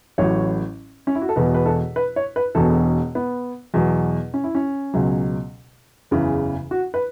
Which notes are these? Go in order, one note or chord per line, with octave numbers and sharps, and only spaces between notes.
A1 A2 F#3 C#5
C#4
E4
F#4
A4
E1 E2 B2 B4
B4
A4
B4
C#5
B4
E1 E2 B2 A4
B3
E2 B2 F#3
C#4
E4
C#4
C#2 B2 F#3
F#1 E2 C#3 E3
F#4
B4